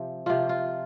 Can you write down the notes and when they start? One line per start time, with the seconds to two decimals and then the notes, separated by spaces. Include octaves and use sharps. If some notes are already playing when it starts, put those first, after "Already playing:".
Already playing: C3 F3
0.26 C3 F3 F4
0.49 F4